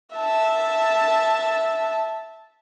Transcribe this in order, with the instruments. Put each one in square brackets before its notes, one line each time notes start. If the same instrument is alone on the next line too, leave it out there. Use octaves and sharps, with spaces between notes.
[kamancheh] E5 A5